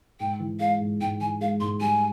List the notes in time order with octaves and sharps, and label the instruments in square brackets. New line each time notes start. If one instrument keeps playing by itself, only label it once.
[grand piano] G#2 [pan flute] G5
[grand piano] E3
[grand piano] G#3 [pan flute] F5
[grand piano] G#2
[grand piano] G#2 [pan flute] G5
[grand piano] E3 [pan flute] G#5
[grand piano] G#3 [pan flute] F5
[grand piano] G#2 [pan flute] C6
[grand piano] G3 [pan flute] G#5